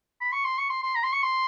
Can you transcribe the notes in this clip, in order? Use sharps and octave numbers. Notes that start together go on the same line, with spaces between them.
B5
C#6
C6
C#6
C6
C6
A#5
C6
C#6
C6